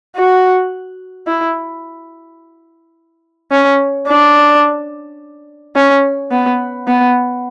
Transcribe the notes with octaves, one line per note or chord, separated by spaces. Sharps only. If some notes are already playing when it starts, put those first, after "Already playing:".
F#4
E4
C#4
D4
C#4
B3
B3